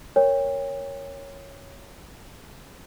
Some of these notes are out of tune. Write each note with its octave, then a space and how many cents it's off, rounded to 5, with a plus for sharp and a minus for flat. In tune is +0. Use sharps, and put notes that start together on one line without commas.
A#4 +0 C#5 +0 G5 +35